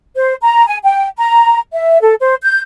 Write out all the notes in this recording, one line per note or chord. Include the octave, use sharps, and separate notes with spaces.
C5
A#5
G#5
G5
A#5
E5
A4
C5
G6